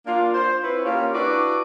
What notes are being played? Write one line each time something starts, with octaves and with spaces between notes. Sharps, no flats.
A#3 D4 F4
C5
C4 E4 B4 C#5
A#3 C#4 F4 G4
D4 E4 F#4 B4 D5